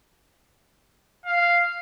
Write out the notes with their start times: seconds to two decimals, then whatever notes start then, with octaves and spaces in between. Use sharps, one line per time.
1.26 F5